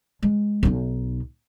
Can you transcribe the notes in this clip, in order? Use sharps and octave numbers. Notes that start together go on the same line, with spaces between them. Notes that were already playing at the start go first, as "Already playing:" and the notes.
G#3
B1 D#4